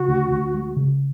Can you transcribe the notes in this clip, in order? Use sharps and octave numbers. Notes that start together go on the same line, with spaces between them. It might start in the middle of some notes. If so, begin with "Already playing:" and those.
Already playing: C#3 F#4
D2
D2
G#3
C#3